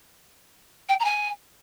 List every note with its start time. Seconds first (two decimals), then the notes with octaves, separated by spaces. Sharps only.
0.89 G5
1.00 A#5
1.05 G#5